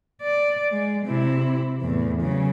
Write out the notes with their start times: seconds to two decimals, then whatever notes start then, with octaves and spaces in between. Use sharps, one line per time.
0.22 D5
0.72 G#3
1.06 C3 E4
1.81 E2 A2
2.21 C#3 F#3